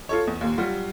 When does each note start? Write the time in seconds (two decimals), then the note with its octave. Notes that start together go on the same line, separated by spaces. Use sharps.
0.09 F4 A4 C#5
0.27 E2
0.41 D#2 A#2
0.58 F#3 G3 F4 F#4